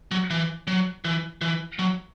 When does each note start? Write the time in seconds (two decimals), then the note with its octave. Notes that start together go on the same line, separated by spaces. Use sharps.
0.11 F#3
0.30 E3
0.67 F#3
1.05 E3
1.41 E3
1.79 F#3